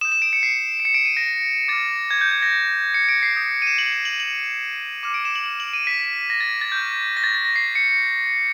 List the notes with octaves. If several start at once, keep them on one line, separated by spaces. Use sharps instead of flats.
D#6 G6 E7
E7
D7
C#7
C7
D7
C#7
D7
D#7
A#6
D6 F6 A6
G#6
G6
G#6
A#6
C#7
D7
C7
D#6 G6
D#7
E7
F#7
F#7
F#7
F#7
D6 F6 E7
D7
E7
F#7
F#7
F#7
D#7
B6
A#6
A6
A6
C#6 F6 G6
A#6
A6
A6
A#6
C7
C#7